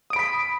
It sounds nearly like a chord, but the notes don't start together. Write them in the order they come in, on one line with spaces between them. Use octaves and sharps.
D#6 D7 B5 B6